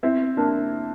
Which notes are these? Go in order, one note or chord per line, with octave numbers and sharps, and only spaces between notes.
C4 E4
A#3 D4